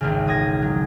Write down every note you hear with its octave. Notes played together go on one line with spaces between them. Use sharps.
G#1 C#2 C#3
E1 D#6 G#6 A#6
F#3